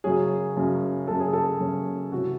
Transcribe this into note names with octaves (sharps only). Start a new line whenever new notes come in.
F#2 C#3 F#3 C#4 G#4
F#2 C#3 F#3 C#4
F#2 C#3 F#3 C#4 A4
G#4
A4
F#2 C#3 F#3 C#4
C3 E3 G#3 C4 F#4